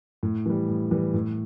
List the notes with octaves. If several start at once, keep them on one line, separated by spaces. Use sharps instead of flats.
A2
E3 G3
A2
E3 G3
A2